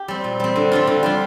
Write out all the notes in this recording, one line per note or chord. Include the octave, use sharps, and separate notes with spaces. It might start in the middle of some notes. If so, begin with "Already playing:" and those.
Already playing: G4
G3 C4
A#2
G3 C4
D3
G3 D4 F4
D3
G3 D4 F4